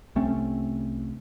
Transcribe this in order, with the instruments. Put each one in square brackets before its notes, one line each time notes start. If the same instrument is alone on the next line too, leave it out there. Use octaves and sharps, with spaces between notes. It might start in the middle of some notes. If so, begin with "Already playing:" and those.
[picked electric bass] C2 A3 C4 C#4